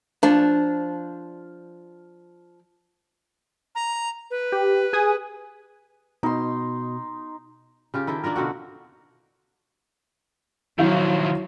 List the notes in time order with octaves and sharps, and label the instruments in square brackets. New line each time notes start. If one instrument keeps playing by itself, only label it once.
[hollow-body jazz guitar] F3 D4
[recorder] A#5
B4
[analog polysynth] G4
G#4 G#5 D#6
[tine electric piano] B2 [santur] D#4 C6
[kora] C#3 F4 G4
D#3 E4 A4 G5
A#3 D4 F4 A#4
B2 D3 C4 F#4
[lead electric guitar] D#3 F3 [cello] F#3 [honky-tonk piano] E4 F5